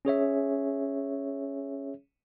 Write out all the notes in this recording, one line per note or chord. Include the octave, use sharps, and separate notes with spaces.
C#4 G#4 C#5 E5